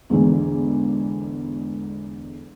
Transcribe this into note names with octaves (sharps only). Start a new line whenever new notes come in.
E2 G#2 D3 E3